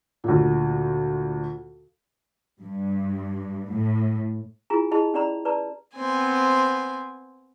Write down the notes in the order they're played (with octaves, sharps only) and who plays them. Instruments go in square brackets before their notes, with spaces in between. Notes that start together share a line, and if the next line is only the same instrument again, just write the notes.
[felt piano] D2 A#2
[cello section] G2
A2
[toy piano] E4 F4 G#4 G#5 A#5
E4 G4 G#4 D#5 A5 B5
C#4 G4 D5 A#5 B5
B4 D5 A5 A#5
[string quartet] B3 C4 C5 G#5